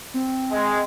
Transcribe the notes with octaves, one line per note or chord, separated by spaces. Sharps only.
C4
G#3